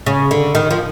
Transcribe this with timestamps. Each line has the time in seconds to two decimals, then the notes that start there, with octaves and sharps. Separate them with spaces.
0.06 C#3
0.31 D3
0.55 D#3
0.70 F3